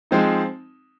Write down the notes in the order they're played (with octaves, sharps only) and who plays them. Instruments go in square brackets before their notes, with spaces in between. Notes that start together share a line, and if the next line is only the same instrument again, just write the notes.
[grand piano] F3 G#3 C4 D#4